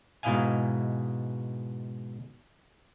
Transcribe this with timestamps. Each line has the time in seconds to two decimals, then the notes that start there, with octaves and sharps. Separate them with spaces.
0.23 G#2 B2 E4 D#5 F5 G#5